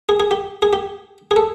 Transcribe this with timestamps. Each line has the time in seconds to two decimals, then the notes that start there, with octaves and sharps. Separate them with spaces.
0.09 G#4
0.20 G#4
0.31 G4
0.62 G#4
0.73 G4
1.31 G#4
1.36 A4